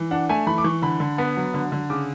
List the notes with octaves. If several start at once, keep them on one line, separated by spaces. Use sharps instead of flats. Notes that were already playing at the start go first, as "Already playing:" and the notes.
Already playing: E3
D4 F#5
A3 G#5
E3 B5
D6
E3 C#6
D3 B5
D3
B3
F#3
D3
D3
C#3 D6